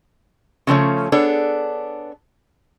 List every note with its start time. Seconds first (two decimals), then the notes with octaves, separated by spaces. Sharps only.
0.67 C#3 F3 A3 C#4
1.12 B3 D4 G#4 A4 C#5